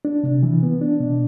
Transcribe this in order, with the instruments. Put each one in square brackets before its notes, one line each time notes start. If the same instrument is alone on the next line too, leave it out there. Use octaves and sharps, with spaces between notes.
[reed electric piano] D4
C3
E3
B3
D4
B2